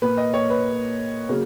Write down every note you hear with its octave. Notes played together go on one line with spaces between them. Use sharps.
A#2 A#3 B4
D#5
C#5
B4
C#3 F#3 A#3